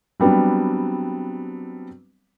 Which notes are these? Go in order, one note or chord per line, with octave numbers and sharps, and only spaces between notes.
F#3 G3 B3 C4 D4